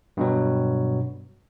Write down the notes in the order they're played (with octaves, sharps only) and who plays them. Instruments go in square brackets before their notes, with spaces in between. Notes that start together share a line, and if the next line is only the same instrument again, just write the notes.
[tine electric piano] G2 B2 F#3